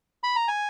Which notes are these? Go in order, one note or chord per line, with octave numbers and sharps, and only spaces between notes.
B5
A#5
G#5